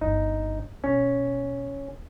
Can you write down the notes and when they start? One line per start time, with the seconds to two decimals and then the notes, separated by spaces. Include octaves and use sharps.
0.01 G1 G#3 D#4
0.84 B2 C#4